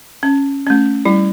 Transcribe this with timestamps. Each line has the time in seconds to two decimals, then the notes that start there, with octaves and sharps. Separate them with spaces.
0.23 C#4
0.67 A3 C#4
1.05 G3 E4